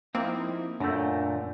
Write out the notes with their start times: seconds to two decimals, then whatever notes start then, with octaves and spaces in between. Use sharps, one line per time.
0.15 F3 A#3 C4 D#4 E4
0.80 F#2 A#2 A3 D4 A#5 G6